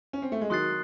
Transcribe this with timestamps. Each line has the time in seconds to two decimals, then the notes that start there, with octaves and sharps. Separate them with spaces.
0.13 C#4
0.22 C4
0.32 A3
0.41 G#3
0.50 D#3 F#3 C6 D#6 F#6 A6 C7